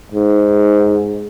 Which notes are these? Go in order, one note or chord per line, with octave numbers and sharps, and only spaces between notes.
G#2